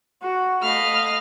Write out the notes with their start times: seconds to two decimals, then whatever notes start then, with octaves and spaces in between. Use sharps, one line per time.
0.22 F#4
0.63 A3 D#5 F5 B5 F6